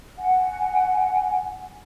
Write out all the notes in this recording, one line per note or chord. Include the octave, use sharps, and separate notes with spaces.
F#5 G#5